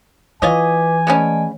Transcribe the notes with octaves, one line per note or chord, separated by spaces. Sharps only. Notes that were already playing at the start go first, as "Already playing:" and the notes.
E3 F4 B4 C#5 D#5 G#5 D6
G#3 A3 B3 C#4 D5 D#5